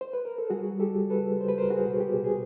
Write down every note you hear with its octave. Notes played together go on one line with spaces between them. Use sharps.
C5
B4
A#4
A4
G3 F#4 G#4
G3
G4 A4
C#2
A4 B4
C#2
C#2 C5
B4
A#4 C5
C#2
F#4 G#4
B2
G4
B2
G#4